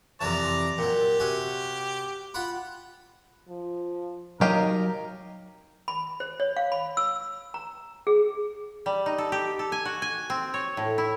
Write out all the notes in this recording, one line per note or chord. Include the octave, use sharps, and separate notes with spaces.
F2 C3 E3 D5 A#5
A#2 F#3 G4
C3 F#4 G#5
F4 F#5 B5
F3
F#3 D#4 G4 A#4 D#5 F5
B5
C5
C#5
F5
B5
E6
A#5
G#4
G3
D#4
A4
G4
A4
G#5
F#4
G#5
C4
C#5
A2
E4